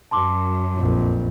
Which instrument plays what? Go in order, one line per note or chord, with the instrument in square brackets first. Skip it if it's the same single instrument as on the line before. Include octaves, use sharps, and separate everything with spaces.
[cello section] F#2 [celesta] A5 C6 D6
[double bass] A#1 F2